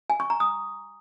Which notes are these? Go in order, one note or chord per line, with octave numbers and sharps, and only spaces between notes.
G#5
C#6
A#5
D#6